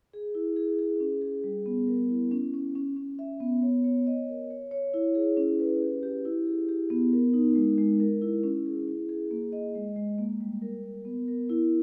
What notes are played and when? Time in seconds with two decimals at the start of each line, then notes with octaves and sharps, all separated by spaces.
0.14 G#4
0.35 E4
0.56 G#4
0.79 G#4
1.00 C#4
1.22 G#4
1.44 G3
1.66 B3
1.88 A#4
2.09 E4
2.31 C#4
2.53 C#4
2.75 C#4
2.96 C#4
3.19 E5
3.40 B3
3.63 C#5
3.84 C#5
4.07 D#5
4.29 A#4
4.51 C#5
4.71 C#5
4.94 E4
5.15 G#4
5.37 C#4
5.59 B4
5.82 G4
6.03 G4
6.25 E4
6.47 G#4
6.69 G4
6.90 B3
7.13 A#4
7.34 D#4
7.55 G#3
7.78 G#3
8.00 A#4
8.22 E4
8.43 C#4
8.66 G#4
8.88 E4
9.09 G#4
9.31 A#3
9.52 D#5
9.75 G#3
9.96 G#3
10.18 A#3
10.40 G3
10.62 A#4
10.84 A#4
11.05 B3
11.28 A#4
11.49 E4